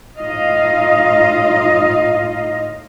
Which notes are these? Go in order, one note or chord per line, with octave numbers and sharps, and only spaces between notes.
A2 D#4 F4 D#5 F5